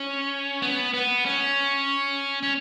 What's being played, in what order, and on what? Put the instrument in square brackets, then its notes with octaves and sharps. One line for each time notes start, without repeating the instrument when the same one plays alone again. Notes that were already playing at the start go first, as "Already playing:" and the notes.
Already playing: [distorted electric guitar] C#4
B3
B3
C#4
C#4